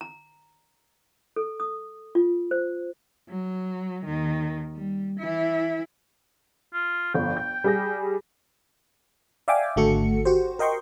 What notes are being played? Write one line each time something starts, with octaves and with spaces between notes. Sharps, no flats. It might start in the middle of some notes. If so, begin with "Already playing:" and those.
A#5
A4
D#6
F4
C5
F#3
D#2 D#3
G3
E3 E4
F4
G1 F2 G5
G6
G3 G#4 A#6
D5 E5 F5 G5 G#5 D6
G#1 D3 A3 F#4 A4 C#7
F#4 G4 C5
A#4 D#5 G5 C6 C#6